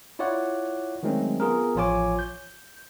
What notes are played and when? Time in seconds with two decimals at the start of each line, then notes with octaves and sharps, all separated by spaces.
0.19 E4 F4 C#5 D5 F#5
1.03 D#3 F#3 G#3 A3 C4 C#4
1.40 B3 F4 G#4 A#4
1.75 A1 F3 F4 C#5 G#5 D6
2.19 G6